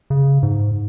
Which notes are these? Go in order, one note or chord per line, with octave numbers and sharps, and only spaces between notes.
C#3
G#2